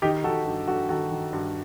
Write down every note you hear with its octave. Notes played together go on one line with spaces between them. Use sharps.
D#3 D#4 G4
D#3 F#4 A4
G2
G2 F#4 A4
D#3 F#4 A4
D#3
G2